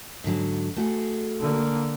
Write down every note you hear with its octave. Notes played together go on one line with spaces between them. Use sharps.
G#2 D3 F#3
A3 F#4 G#4
D3 A#3